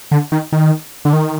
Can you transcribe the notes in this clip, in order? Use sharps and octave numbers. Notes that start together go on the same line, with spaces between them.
D3
D#3
D#3
D3
D#3